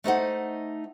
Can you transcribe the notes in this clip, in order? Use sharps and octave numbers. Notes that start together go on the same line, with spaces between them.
A3 D#4 C5 F#5